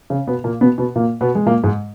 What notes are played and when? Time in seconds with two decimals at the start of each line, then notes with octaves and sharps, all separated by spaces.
0.10 C#3
0.27 B2 B3
0.44 A#2 A#3
0.61 B2 B3
0.78 B2 B3
0.96 A#2 A#3
1.21 B2 B3
1.35 G#3
1.46 A#2 A#3
1.64 G#2 G#3